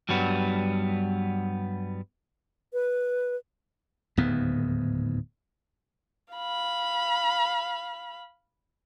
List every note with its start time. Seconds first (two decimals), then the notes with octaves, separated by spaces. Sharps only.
0.09 G2 F#3 G3 B3
2.73 B4
4.17 D1 D#2 G#2 B3
6.34 F5 B5